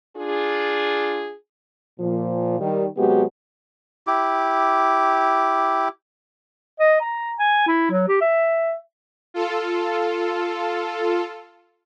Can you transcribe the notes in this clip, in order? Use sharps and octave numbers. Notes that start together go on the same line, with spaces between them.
D4 F4 G#4
A#2 F3
D#3 G3
C3 F#3 G#3 B3 F#4 G4
E4 G4 D6
D#5
A#5
G#5
E4
F#3
G4
E5
F4 A4